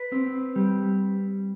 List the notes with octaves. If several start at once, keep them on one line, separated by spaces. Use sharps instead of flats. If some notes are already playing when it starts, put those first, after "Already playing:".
Already playing: B4
C4
G3